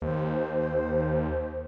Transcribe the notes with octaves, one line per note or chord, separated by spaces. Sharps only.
D#2 C5